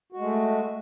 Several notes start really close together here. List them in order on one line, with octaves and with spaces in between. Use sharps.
F#4 G#3 A3